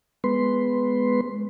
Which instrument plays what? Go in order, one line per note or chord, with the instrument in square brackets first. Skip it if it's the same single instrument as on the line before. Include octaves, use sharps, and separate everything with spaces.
[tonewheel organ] G#3 B3 B4 C6